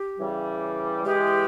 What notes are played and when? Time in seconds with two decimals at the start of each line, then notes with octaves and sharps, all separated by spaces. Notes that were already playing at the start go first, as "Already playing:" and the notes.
Already playing: G4
0.19 C#3 E3 G3
1.05 C#3 E3 G#3 G4